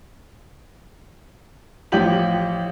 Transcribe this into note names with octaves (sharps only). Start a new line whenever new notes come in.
A1 F3 F4 G4 F#7